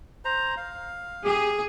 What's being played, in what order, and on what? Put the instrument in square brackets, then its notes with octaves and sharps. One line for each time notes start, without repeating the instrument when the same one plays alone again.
[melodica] C5 A#5
F5
[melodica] G4 [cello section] G#4